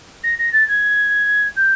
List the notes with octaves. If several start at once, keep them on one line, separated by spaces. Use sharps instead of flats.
A#6
A#6
A6
G#6
G6